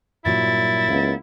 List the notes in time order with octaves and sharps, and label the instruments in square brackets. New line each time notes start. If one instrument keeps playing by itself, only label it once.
[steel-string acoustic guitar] G2 A#2 F#3 [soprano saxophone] E4 [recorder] A6
[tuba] C#2 [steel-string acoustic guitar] A#3 B3